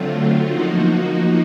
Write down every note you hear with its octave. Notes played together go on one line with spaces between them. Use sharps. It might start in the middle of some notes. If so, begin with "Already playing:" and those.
Already playing: D3 F#3 A3 C4 F4
F3 A#3 D#4 F#4